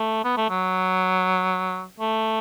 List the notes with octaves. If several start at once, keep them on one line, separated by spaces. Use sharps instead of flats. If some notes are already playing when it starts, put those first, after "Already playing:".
Already playing: A3
B3
A3
F#3
A3